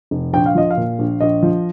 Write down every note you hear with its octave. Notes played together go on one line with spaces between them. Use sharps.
F1
A#1 G5
F5
F3 D#5
F5
A#2
A#1
A#1 D#5
F3